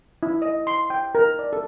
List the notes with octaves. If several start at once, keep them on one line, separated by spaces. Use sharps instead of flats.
E4
D#5
C6
G5
A#4
D5
A4